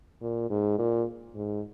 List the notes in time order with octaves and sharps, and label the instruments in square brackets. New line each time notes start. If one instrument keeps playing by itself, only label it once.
[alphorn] A#2
G#2
A#2
G#2